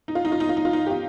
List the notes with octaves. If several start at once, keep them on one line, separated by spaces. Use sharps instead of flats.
D#4
F4
D#4
F4
D#4
F4
D#4
F4
D#4
G4
F4